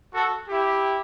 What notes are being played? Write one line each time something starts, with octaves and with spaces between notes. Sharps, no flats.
F#4 A4
E4 G4